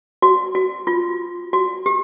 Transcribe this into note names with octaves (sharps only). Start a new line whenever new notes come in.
F#4
F#4
F4
F#4
G4